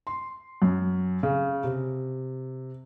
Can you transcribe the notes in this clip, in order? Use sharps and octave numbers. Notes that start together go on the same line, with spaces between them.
C6
F#2
C#3
C3